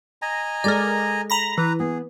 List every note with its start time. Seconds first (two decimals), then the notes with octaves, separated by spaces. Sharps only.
0.22 D#5 G#5 A#5
0.64 G#3 A4 A#4 D5
1.30 A#5 B5 A#6
1.58 E3 B4 A#5
1.80 B3 G#4